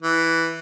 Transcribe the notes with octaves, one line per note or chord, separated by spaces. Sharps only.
E3